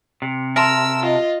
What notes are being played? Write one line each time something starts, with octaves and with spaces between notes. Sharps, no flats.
C3
A#4 E5 A5 C6 E6
F4 D#5